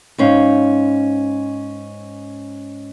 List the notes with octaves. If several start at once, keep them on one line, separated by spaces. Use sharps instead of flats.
G#2 C#4 F5